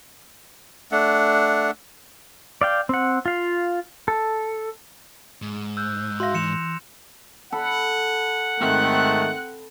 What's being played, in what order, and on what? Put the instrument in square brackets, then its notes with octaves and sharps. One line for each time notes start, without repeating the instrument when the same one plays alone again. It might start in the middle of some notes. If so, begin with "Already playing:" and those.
[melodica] A3 D4 F#5
[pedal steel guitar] D5 F5 G5
C4 F#5
F4 F5
A4
[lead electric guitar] G#2
[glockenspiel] E6 F#6 G6
[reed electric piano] F#4 E5 F5 [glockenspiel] C6 A#6
[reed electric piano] E3 [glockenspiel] C#7 E7 F7
[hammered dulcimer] A4 B5 [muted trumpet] F#5
[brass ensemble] G#2 D#3 A3 [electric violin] C4 F#6